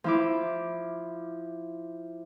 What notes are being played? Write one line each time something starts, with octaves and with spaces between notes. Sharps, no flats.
F3 E4 D6